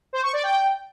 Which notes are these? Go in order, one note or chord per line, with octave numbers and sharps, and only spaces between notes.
C5
C#6
D5
G5